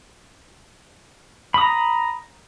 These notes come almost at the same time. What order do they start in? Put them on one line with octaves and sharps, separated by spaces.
B5 D#6 A#5